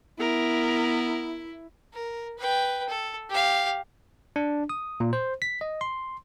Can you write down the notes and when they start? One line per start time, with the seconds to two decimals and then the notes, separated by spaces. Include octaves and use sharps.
0.20 B3 E4 A#4
1.93 A#4
2.38 B4 G5
2.89 A4
3.30 G4 F5
4.36 D4
4.69 D#6
5.00 A#2
5.13 C5
5.42 B6
5.61 D#5
5.81 C6